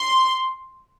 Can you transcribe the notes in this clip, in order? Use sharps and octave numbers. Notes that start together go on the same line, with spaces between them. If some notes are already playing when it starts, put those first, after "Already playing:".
Already playing: C6